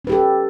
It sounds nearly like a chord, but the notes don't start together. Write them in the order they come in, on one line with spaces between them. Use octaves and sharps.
C#4 B4 G4 A4